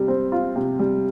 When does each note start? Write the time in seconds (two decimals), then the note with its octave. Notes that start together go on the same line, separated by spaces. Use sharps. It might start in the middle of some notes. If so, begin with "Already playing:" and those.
Already playing: C3 G3
0.08 C4
0.32 F4
0.56 C3
0.79 G3